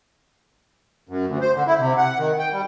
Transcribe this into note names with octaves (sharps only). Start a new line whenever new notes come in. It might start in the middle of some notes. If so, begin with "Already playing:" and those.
F#2
D2
C5
D3
E4
C3
F#5
D#3
G5
G3